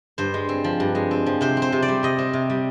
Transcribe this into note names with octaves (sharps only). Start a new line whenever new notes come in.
G2 C5
G#3
C4
F3
G2
G#3
C4
F3
C3 C5
C4
C5
C3
D5
G3
C3 D#5
C4
C3
G3